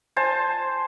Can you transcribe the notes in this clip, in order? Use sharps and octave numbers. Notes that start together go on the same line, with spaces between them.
C5 G#5 A5